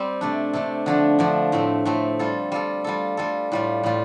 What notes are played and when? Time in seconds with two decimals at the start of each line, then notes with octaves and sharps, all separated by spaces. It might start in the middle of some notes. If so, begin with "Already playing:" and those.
Already playing: G3 C4 G4
0.21 C3 A3 D4
0.53 C3 A3 D4
0.86 D3 F3 A3 D4
1.19 D3 F3 A3 D4
1.52 A2 A3 C4
1.85 A2 A3 C4
2.19 G3 F4 A4
2.52 G3 F4 A4
2.84 G3 F4 A4
3.17 G3 F4 A4
3.52 A2 G3 F4
3.83 A2 G3 F4